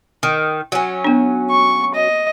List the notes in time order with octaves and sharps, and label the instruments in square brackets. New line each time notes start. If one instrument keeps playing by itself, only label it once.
[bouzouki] D#3
F#3 C#4
[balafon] B3 D4
[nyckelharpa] C#6
D#5